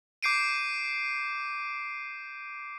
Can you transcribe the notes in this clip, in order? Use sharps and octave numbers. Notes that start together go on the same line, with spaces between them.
D6 G6 C7 D7 D#7